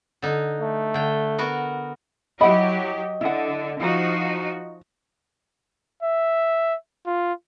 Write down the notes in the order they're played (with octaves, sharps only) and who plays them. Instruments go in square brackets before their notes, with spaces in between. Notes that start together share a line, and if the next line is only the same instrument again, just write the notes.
[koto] D3 D#4
[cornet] A3
[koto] D3 G5
B3 F#4 A#4
[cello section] F#3 G4 [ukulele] E4 F#5 B5 [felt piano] D#5
[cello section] D3 [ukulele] E4 F#5
[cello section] F3 D#4 F#4 [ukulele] E4 A#5
[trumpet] E5
F4